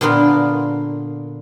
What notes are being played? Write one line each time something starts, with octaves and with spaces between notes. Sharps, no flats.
A#2 D3 B3 F4 A#4